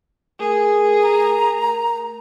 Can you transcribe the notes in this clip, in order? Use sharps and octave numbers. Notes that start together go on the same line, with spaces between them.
A3 G#4 A#4 D#6
A#5